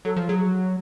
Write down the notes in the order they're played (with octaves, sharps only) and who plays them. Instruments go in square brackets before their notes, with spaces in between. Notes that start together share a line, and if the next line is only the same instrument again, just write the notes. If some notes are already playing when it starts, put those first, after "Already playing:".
[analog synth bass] F#3 [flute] A4
[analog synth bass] F3
[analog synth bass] F#3 [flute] G#4